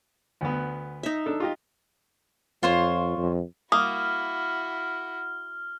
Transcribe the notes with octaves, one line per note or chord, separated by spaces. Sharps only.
D2 B3
D#4 E5
D4 A4
F4 G4 D#5
F2 F4 C5 C#5
F2
A#3 E4 F#4 D#6 F6